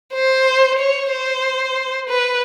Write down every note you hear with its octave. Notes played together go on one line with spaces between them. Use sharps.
C5
C#5
C5
B4